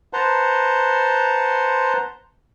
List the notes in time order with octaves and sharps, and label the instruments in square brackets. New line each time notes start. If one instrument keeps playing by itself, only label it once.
[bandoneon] B4 C5 F#5 A5 A#5 C6